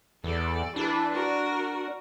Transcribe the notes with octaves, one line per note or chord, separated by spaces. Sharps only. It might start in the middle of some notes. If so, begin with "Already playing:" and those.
E2 A4 D5
E3 D4 B4
F#4 A#4